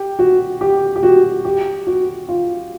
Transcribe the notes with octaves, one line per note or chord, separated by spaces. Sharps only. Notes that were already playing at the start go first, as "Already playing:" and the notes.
Already playing: G4
F#4
G4
G4
F#4
G4
F#4
F4